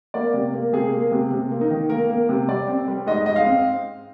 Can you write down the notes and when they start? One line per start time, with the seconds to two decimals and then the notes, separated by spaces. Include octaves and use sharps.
0.14 A#3 D5
0.34 C3
0.54 A#3
0.73 C3 G#4
0.93 A#3
1.12 C3
1.32 C3
1.51 A#3
1.61 D#4
1.70 D#3
1.90 A#3 A#4
2.09 A#3
2.29 C3
2.48 G3 D5
2.68 C4
2.88 G3
3.07 G#2 D#5
3.26 G#2 D#5
3.36 F5
3.45 C4